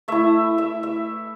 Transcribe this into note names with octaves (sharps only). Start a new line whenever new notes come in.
A3 E4 E5
E5
E5